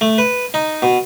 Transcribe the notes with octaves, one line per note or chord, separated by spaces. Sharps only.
A3
B4
D#4
B2